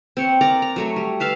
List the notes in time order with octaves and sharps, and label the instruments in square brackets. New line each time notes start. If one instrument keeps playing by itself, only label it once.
[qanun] C4 C#5 F#5
A#4 D5 A#5
A#5
F#3 A3 C#5
G3
B4 E5 F5 A5